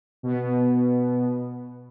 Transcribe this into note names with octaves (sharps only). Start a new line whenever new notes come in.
B2 B3